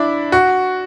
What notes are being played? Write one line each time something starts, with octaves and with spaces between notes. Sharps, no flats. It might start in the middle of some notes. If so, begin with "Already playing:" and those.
Already playing: D4 E4
F#4